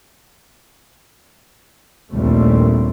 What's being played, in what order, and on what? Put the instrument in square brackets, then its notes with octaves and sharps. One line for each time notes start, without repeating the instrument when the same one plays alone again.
[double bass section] A#1 D#2 A#2 G3 A3 C4